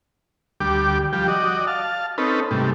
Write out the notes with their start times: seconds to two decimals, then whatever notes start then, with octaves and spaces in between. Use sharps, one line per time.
0.60 D2 G3 G4 D6
1.13 F3 G3 G4
1.28 F#4 D5 D#5
1.67 F5 A5
2.18 C4 C#4 D#4 A4 B4
2.51 G#2 C3 G3 A3